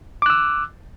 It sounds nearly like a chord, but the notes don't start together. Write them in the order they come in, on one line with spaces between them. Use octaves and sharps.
D6 F#6 E6